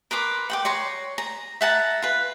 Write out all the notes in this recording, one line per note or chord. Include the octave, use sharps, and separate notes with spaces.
A#4 B4 C6 D6
F#5 G5 D6
C#5 A#5 C6
A#5
E5 F#5 A5 A#5
F4 B4